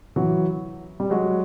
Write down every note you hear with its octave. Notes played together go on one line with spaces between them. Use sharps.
E3 F#3
G3
F#3 G#3